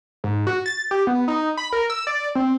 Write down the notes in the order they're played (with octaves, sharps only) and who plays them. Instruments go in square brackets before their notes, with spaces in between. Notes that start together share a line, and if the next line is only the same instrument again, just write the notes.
[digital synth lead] G#2
F#4
A6
G4
B3
D#4
B5
A#4
E6
D5
C4